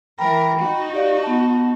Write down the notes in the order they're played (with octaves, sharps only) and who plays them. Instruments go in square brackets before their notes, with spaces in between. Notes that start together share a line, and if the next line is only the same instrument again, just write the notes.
[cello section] E3 A#4 [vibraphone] G5 A#5 B5
[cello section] D#4 F#4
[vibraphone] G4 D5 F5
B3 F#5 A5